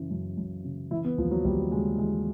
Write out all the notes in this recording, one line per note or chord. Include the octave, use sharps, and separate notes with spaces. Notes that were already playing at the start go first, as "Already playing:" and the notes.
Already playing: F#2 C#3 E3
F#2
F#2
C#3
E3 E4
B3
D#2 F3
F#3
D#2 G3
C#3 G#3
E3 G#3